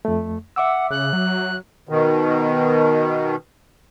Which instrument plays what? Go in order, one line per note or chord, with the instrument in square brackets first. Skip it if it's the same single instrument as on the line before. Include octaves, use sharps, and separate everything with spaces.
[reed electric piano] F2 A3
[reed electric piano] E5 D6 E6 [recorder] F#5
[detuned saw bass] C#3 [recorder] F#6
[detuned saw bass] F#3
[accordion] B2 D#3